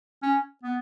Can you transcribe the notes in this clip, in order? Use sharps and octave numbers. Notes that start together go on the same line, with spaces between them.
C#4
B3